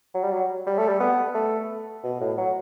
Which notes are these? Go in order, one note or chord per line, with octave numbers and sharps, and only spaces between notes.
F#3
G3
F#3
G3
A3
G3
B3
A3
B2
A2
F#3